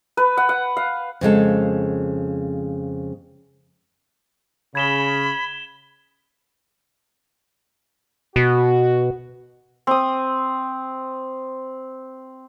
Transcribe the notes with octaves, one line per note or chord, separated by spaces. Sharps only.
B4
F#5
F#5
F5
F2 C#3 G#3 A4
C#3 B5 G#6 E7 G7
B2 F#4
C4 D#6